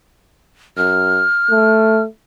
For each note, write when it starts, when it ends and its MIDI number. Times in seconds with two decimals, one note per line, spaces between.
0.77 1.23 42
0.77 2.02 89
1.50 2.05 57